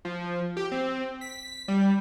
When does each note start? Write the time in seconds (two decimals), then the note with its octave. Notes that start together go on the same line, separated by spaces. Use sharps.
0.05 F3
0.57 G4
0.72 C4
1.21 B6
1.68 G3